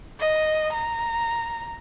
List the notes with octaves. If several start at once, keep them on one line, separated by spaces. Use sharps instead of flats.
D#5
A#5